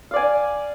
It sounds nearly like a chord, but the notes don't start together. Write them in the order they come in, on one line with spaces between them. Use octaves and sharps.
F5 D5 G#5